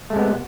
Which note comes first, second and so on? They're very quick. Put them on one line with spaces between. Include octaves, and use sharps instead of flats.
A3 G#3 C3 B3